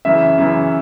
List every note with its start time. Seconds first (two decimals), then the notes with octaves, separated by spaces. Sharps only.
0.05 F#2 C#3 E3 E5
0.38 F#2 C#3 E3